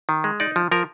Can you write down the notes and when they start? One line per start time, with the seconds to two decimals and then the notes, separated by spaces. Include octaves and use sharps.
0.09 D#3
0.24 G#3
0.40 D#4 D5
0.56 F3
0.72 F3 A#4